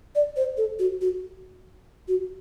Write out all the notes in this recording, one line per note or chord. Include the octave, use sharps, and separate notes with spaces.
D5
C5
A4
F#4
F#4
F#4